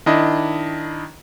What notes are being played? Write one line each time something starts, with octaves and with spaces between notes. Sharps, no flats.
D#3 D4 E4 D#5